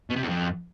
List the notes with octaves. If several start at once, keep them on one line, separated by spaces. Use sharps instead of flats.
B2
C3
E2
F2